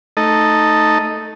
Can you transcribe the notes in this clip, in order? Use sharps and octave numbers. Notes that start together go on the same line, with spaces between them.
A3 D#4 A4 D#5